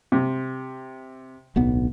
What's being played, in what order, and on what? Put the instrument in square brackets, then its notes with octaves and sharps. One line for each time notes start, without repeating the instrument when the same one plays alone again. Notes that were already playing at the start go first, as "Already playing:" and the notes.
[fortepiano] C3
[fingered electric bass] D1 B1 B3